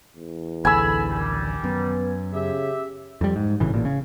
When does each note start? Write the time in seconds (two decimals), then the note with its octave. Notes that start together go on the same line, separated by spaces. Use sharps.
0.16 E2
0.65 A1 D2 A4 G#5 B5 E6
1.09 D#3 G3
1.64 F#2 B3
2.34 C#3 G4 E5
3.21 F2 G3
3.36 G#2
3.60 G#1 A2 C#3 E3
3.74 A1 A#2
3.85 C#3